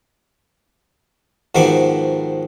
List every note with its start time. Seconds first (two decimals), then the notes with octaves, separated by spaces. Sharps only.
1.55 G#2 D#3 F3 B3 F#4 D6